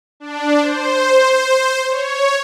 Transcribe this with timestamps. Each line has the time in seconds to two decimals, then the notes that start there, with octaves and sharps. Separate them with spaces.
0.20 D4
0.61 C5
1.89 C#5